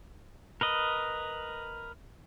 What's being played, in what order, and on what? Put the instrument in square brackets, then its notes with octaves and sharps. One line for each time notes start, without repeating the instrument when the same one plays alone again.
[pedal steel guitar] A#4 B4 D#5